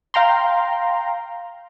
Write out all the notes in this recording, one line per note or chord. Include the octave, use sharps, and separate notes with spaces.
F5 G5 A#5 C6